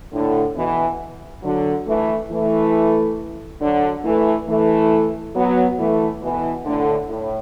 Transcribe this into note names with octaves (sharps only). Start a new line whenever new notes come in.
A2 D3
B2 E3
D3 F#3
E3 A3
E3 A3
D3 F#3
E3 A3
E3 A3
F#3 B3
E3 A3
B2 E3
A2 D3
A2